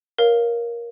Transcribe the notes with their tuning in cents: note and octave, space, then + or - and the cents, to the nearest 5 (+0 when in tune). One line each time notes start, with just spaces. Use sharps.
A#4 +15 C#5 +0 F5 +0